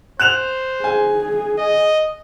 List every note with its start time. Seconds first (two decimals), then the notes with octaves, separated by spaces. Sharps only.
0.20 C5 F#6 E7 F7
0.84 G#4 G#5
1.58 D#5